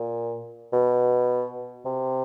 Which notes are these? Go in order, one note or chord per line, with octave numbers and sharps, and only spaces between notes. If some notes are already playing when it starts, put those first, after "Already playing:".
Already playing: A#2
B2
C3